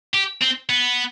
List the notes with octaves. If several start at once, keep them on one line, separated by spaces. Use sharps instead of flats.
G4
C4
B3